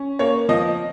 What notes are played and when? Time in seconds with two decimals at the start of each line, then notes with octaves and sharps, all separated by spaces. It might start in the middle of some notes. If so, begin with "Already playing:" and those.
Already playing: C#4
0.19 A#3 C#5
0.49 F3 D#5